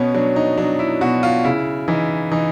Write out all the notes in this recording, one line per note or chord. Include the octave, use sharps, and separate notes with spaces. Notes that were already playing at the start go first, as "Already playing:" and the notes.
Already playing: B2 B3 C#4
F#3 D4
D#4
F#3 D4
E4
B2 F#4
F4
C#3 E4
E3 D#4
E3 D#4